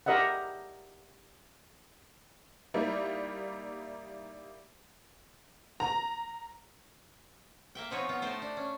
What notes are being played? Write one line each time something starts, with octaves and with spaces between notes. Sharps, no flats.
G4 A#4 D#5 E5 F#5
G3 A#3 D#4 E4
A#5
A#3 E5 G5
B2 F3 C4 D#4 B4 C#5
B3 F4
A3 D#4 C5 G5 A5
D4
C#4